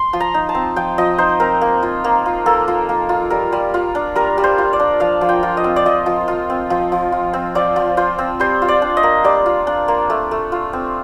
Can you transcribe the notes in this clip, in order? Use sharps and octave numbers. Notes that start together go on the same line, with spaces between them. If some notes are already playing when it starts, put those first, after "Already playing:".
Already playing: C6
F3
A#5
D#4
A5
C4
F3 G5
F3 D#5
D#4 C5
C4 A#4
A#3
F4
A#3
F4
A#3 A4
F4
A#3
F4
G3 A#4
G3
F4
D4
G3 A#4
G3
C5
F4
D5
D4
F3 F5
F3
G5
F4
D#5
C4
D5
F3 D#5
F3
F4
C4
F3
F3
F4
C4
F3 D5
F3
F4 C5
C4
G3 C5
F4
D5
D4
D#5
A#3
G3 D5
F4
D4
A#3
A3
A3
F4
C4